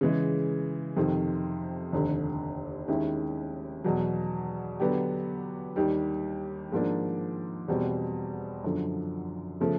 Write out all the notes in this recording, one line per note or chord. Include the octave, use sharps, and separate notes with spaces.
C#3 E3 G#3
F2 C3 D#3
F1 D#2 D3
D#2 D#3 G#3 C#4 E4
E2 B2 F#3
D3 F#3 B3 D4 G4
D#2 D#3 G3
G#2 F3 A#3 D4
E2 B2 G3 C4
F#2 D3 F3
C#3 F3 A3